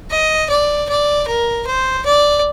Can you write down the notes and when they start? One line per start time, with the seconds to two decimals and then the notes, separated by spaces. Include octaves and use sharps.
0.11 D#5
0.49 D5
0.89 D5
1.28 A#4
1.67 C5
2.05 D5